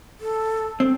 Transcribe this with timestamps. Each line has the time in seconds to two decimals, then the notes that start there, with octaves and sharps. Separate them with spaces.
0.20 A4
0.80 C4